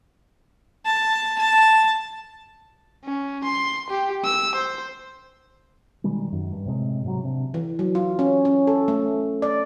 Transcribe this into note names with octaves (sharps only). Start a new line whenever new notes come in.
A5
A5
C#4
C6
G4
E6
C5
B2 D#3 G3 G#3
F#2 D#3
G2
A2 C3 G#3
G#2 C3 E3 F#3
C3 D4
E3
F#3
F4
C#4
C#4
A4
A3
D5